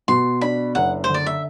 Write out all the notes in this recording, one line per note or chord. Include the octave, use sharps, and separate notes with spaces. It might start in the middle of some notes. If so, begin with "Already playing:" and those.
B2 C6
D4 B5
F#1 F#5
C5
D3 D5
E5